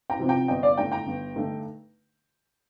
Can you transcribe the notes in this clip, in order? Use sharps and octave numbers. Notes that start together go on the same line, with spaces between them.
G5 A#5
C3 F3 C4 D#4
G5 A#5
G1 D#5 G5
D5 F5
G2 D3 A3 D#4 G5 A#5
G5 A#5
G1
G2 D3 A3 D#4